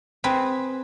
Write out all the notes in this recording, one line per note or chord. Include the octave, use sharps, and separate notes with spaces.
C4 G#4 B4